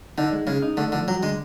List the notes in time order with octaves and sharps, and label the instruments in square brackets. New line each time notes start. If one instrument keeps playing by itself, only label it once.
[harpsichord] D3 [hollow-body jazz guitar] D#4
[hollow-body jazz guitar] G#3
[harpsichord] C#3 [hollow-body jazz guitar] G#3
[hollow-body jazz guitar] D#4
[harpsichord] D3 [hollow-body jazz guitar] A3
[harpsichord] D3 [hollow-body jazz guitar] F3
[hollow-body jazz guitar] G2 [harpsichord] F#3
[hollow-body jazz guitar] D3 [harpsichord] G#3